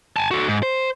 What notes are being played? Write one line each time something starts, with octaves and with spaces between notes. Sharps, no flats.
G#5 A5
F#4 A4
G#2
C5